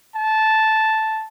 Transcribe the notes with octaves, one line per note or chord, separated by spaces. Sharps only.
A5